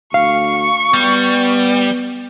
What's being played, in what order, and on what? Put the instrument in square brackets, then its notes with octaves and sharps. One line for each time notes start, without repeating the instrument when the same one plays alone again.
[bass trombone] D2 [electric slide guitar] F5 [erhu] C#6
[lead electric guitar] G3 [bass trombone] B3